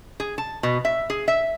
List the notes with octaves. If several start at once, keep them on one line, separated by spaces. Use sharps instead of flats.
G#4
A5
B2
E5
G#4
E5